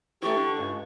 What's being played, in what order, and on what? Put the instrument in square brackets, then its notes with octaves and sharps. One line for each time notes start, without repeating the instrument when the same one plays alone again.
[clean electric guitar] E3 A3 [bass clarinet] G4 [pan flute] C#6
[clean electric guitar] D3
[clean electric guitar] C#2 [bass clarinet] G2